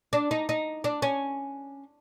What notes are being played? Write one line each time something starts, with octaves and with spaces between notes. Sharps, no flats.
D4
D#4
D#4
D4
C#4